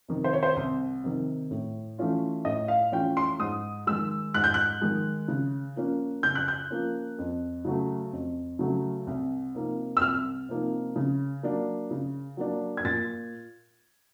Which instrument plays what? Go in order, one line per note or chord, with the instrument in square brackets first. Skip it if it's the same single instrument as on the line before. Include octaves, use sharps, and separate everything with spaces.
[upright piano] C3 D#3
C5
C#5
C5
C2
C3 D#3
A2
E3 A3 C#4 F4
A2 D#5
F5
E3 A3 C#4 F4 G5
C6
G#2 D#6
D#3 G#3 E6
G#2 F#6
G6
F#6
D#3 G#3
C#3
F3 A#3 C#4
C#3 G6
F#6
G6
F3 A#3 C#4
F2
C#3 F#3 A3
F2
C#3 F#3 A3
C2
C3 F3 A#3 D#4
E6
C2 F6
C3 F3 A#3 D#4
C#3
F#3 A#3 D4
C#3
F#3 A#3 D4
G#6
A#2 A6